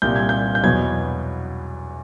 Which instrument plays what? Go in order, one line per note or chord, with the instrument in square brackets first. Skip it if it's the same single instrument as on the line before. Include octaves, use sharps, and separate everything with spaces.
[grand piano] C2 A#2 G3 G6
G#6
G6
G6
E2 B2 F#3 B3 G#6